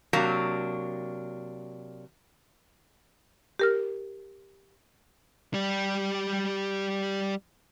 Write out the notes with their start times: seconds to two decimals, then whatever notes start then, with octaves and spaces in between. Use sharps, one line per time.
0.13 C3 F#3 A#3 D4
3.59 G4 A#4 F6
5.54 G3 G4